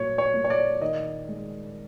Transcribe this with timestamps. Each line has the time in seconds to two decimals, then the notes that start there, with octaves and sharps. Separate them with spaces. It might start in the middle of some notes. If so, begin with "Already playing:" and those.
Already playing: A#2 F#3 C#5
0.18 C#5
0.34 A#2
0.44 C#5
0.50 D5
0.81 D#3 D#5
1.28 G#3